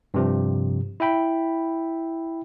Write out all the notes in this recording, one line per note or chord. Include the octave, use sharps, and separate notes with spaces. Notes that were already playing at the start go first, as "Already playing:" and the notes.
G2 C3 F3
E4 E5 G5 B5